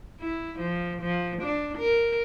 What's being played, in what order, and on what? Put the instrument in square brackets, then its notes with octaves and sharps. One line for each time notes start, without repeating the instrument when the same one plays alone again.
[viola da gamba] E4
F3
F3
D4
A#4